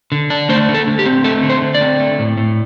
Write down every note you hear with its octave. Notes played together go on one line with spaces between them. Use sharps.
D3
D4
A3 C5
D3
A4
D3
G4
C4
A3 A4
D3
C5
D3
D5
C4
A3
A2
A2